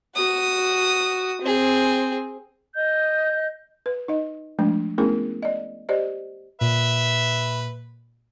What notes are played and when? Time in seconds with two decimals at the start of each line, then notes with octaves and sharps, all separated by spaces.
0.16 F#4 D#6
1.41 C4 G#4
2.75 D#5 G6
3.86 B4
4.08 D#4 D#5
4.59 F3 G#3 A3 D4
4.98 A3 B3 C#4 E4 G#4 A#4
5.43 D5 D#5
5.89 G4 C5 D5 D#5
6.61 A#2 B4 E5